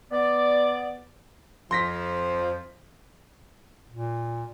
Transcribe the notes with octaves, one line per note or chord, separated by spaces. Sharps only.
B3 D5
F2 F3 C6 A#6 B6
A#2